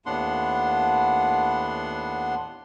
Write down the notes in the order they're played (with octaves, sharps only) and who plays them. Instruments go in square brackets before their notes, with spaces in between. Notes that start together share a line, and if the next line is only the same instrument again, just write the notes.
[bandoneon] D#2 A2 B3 D4 F#5 C6